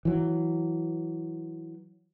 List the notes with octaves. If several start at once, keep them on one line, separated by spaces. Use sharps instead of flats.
E3 F#3